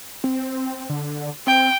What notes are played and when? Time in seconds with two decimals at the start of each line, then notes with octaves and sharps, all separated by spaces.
0.24 C4
0.89 D3
1.47 C4 G5